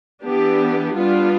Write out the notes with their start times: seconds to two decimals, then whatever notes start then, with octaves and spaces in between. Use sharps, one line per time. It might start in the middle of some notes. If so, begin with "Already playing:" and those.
0.24 E3 B3 D4 G4
0.95 G3 B3 D4 F4